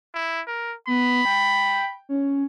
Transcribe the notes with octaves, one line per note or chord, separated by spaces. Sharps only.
E4
A#4
B3 B5
G5
C#4